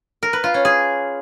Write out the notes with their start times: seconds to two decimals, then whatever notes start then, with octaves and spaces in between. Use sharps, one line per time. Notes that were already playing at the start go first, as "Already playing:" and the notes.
0.23 A#4
0.33 B4
0.44 F4
0.54 C#4
0.65 G#4